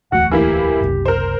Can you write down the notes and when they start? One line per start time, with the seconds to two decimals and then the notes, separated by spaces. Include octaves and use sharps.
0.12 D1 E2 A3 F#4 F#5
0.31 E3 A#3 E4 G4
0.80 F#1 C2
1.06 A#4 C5